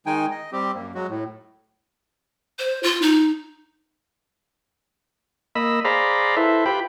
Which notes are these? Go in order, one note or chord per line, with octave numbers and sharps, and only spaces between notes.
D#3 G#3 D#4 G5 G#5
D#5
G3 C4 G4
F#2 A#3
F#3 G#3 F#4
A2
C5
F4
D#4
A#3 D#5 B5 E6
G#4 C5 D5 F5 A#5 B5
E4 A4 B4 C5 E5
F4 G4 B4 G5 B5